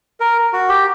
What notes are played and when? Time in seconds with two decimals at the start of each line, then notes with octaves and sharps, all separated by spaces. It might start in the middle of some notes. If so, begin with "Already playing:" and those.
0.20 A#4
0.53 F#4
0.69 G4